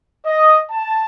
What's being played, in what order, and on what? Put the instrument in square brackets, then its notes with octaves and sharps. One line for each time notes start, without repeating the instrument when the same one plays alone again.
[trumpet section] D#5
A5